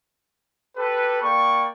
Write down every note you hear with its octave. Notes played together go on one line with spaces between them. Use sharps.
G4 A4 B4
A#3 D5 G5 C#6